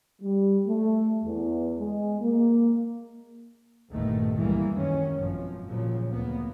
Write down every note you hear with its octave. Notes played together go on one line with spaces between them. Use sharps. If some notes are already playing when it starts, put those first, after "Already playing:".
G3
A3
E2
G#3
A#3
G1 E2 G2 A#2 D#3 A3
C#2 E3 G3 G#3 A#3
F#2 D#3 C#4
G#1 F#2 B2 F3
A#2 C#3 F3 F#3
D2 A#3 B3